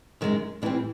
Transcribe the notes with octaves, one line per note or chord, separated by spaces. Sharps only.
F#2 D#3 G#3 C#4
A2 E3 G3 C4 D4